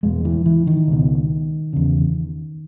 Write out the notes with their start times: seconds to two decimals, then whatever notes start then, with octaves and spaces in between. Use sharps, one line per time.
0.03 E2 B2 G#3
0.25 E3
0.46 E3
0.67 D#3
0.88 C#2 B2
1.73 E2 C#3